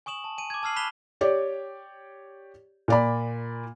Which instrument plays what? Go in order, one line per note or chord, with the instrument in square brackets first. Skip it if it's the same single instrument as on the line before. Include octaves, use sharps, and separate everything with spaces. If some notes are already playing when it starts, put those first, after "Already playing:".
[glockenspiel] G#5 C#6 D#6 E7 F#7
A5
G#5 D#7
D6 G#6
A5 E6 F6 C7 F#7
B5 F#6 B6 E7 F7 G7
[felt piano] G4 C#5 D5
A#2 D5 B5